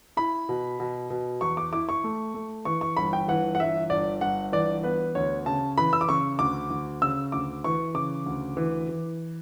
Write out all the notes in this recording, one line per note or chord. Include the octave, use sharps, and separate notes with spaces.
E4 B5
B2
B2
B2
E2 C#6
D6
E4 D6
C#6
A3
A3
E3 C#6
C#6
G1 B5
G5
E3 F#5
F#5
G1 E5
G1 D5
G1 F#5
E3 D5
B3 B4
D2 C#5
C#3 A5
E3 B5
E6
D6
C#3 C#6
D2 D6
D2
C#3 E6
D2 D6
E3 C#6
C#3 D6
D2
E3
E3